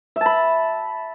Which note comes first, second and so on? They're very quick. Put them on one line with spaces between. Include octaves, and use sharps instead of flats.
E5 A5 B5